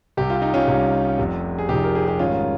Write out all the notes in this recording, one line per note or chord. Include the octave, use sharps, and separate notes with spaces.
C2 C3 G3 G4
F4
D#4
C#4 F4
C2 C3 G3
F1 F2 C3
G#4
F1 F2 C3 D#4 G4
A#4
G#4
G4
G#1 G#2 D#3 G3 C#4 F4